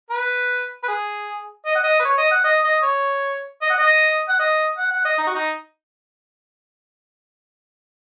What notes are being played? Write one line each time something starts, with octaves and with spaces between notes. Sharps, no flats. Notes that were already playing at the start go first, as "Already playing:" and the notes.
B4
B4
G#4
D#5
F#5
D#5
B4
C#5
D#5
F#5
D#5
D#5
C#5
D#5
F#5
D#5
F#5
D#5
F#5
F#5
D#5
D#4
F#4
D#4